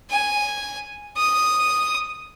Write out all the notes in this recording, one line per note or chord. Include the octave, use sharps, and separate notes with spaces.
G#5
D#6